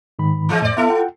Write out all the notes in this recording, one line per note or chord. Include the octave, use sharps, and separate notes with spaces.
G#2 D#3 B5
E3 G#3 C4
F2 A2 C4 D5
B3 E4 A4 E5
F4 F#5 G5